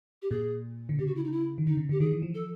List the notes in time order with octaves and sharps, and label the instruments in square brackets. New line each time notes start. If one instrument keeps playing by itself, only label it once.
[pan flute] G4
[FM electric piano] A#2 [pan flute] G#4
[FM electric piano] D3
[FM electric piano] C#3 [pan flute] G4
[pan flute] F#4
E4
D#4
E4
[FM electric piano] D#3
[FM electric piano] D3 [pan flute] D#4
[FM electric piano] C#3
[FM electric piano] D3 [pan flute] G4
[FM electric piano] D#3 [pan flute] G#4
[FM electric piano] E3
F3
[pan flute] A4